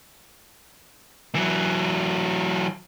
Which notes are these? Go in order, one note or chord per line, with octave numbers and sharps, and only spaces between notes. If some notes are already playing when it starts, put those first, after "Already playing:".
E3 F#3